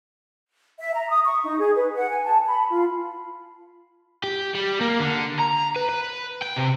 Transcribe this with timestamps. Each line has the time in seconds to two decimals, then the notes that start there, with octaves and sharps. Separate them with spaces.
0.80 E5
0.94 A#5
1.10 D#6
1.24 C#6
1.45 D#4
1.59 G#4
1.76 B4
1.95 F#5
2.10 G#5
2.24 A5
2.46 B5
2.71 F4
4.24 G4
4.55 G3
4.81 A#3
5.00 D3
5.39 A#5
5.76 B4
5.89 B4
6.42 G5
6.56 C3